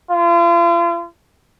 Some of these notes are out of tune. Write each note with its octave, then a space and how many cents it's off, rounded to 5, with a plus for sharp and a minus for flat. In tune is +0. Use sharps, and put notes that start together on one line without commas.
F4 -40